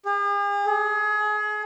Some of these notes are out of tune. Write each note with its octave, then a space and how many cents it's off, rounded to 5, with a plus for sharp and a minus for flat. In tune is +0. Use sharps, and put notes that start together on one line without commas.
G#4 -45
G#4 +30